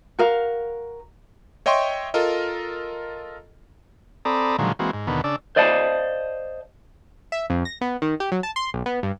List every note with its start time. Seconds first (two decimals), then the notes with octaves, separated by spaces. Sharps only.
0.19 F#4 A#4 F5
1.66 C#5 D#5 E5 G5 C6 C#6
2.14 F4 A4 A#4 D#5
4.25 C4 A4 D5 A#5 B5 D#6
4.59 A#2 D3 D#3 F3 F#3 G#3
4.79 E3 G#3 A#3 C4 F#4
4.93 G#2
5.07 D#2 B2 D3 D#3 B3
5.24 C#3 D4 D5 E6
5.56 C5 D5 D#5 F5 A5
7.32 E5
7.50 F2
7.65 A#6
7.81 B3
8.02 D#3
8.20 G4
8.32 F#3
8.43 A5
8.56 C6
8.74 B1
8.86 B3
9.03 G2